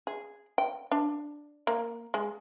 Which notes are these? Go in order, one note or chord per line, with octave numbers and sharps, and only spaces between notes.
G#4
G5
D4
A#3
G#3